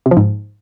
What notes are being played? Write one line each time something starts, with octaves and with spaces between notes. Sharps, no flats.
C3
F3
G#2